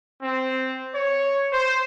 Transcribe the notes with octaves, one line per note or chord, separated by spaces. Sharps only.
C4
C#5
C5